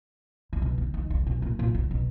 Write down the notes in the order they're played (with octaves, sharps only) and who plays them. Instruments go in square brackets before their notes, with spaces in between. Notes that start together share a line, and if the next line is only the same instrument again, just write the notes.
[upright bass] D3
B2
D3
D#3
D3
B2
A#2
A#2
D3
B2